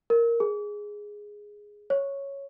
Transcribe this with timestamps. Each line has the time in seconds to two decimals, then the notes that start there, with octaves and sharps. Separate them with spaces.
0.10 A#4
0.40 G#4
1.90 C#5